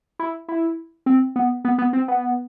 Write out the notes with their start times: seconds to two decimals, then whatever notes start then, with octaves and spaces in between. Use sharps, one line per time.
0.19 E4
0.48 E4
1.06 C4
1.36 B3
1.65 B3
1.78 B3
1.93 C4
2.08 B3